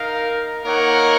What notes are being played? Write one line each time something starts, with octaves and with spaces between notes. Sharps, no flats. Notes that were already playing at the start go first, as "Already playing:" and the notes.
Already playing: D#4 A#4 F5
A#3 D#4 A#4 C#5 F#5